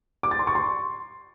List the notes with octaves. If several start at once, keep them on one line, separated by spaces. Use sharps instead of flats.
D6
A6
C6
C#6
C6